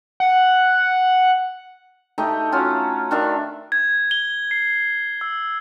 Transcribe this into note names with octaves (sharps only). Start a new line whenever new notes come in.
F#5
A3 D#4 G4
C#4 F4 F#4
D#3 D4 E5 F5
G#6
G7
C7
E6